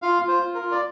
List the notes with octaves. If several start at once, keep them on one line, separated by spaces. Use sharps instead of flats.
F4 F5
F4
C5
F4
A#4
F4
D5